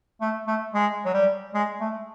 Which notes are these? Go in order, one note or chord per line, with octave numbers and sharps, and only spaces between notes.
A3
A3
G#3
F#3
G3
G#3
A3